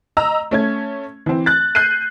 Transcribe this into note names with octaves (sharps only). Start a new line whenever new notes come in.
D#5 A#5 E6
A3 C#4 G#6
E3 C4
F#6 A6
F#6 G6 C7 D#7